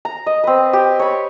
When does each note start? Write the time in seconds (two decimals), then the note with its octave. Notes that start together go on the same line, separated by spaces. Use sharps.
0.05 A#5
0.26 D#5
0.44 C4 B4
0.73 G4
0.99 C#5 B5